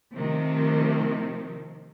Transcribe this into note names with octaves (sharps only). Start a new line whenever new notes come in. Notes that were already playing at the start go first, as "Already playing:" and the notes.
C3 D#3 F3 A3 C4